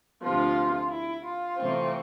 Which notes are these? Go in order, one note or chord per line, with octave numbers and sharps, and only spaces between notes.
D2 C3 F3 F4
E4
F4
C3 E3 A3 C4